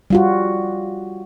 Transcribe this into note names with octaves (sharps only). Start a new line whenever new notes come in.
G3 F4 F#4